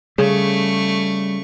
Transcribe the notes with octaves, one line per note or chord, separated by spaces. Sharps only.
C#3 G3 A3 C#6